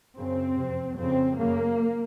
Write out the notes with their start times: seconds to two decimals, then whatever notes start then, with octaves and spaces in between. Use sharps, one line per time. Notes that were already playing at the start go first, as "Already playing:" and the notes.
0.17 F#2 C#3 C4
0.57 F2 C3
0.98 F2 C#3 C4
1.39 F#2 C#3 A#3